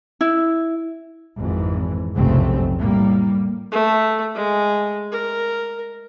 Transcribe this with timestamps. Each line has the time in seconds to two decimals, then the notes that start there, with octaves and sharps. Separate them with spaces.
0.21 E4
1.37 G#1 F2 G#2 E3
2.16 F1 B1 G#2 C#3 A3 C4
2.78 A2 G3 A#3
3.72 A3
4.35 G#3
5.12 A#4